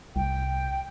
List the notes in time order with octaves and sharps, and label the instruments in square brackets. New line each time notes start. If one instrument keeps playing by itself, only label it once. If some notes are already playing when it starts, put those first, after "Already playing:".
[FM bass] C2 [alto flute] G5